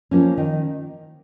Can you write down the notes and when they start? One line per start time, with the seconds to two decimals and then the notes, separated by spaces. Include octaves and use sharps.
0.11 F3 A#3 C#4
0.37 D#3